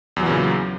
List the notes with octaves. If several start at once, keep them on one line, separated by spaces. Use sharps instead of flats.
E2 A#2 C#3 E3 F#3